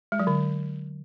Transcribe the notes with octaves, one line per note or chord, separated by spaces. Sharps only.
G#3
F#3
D3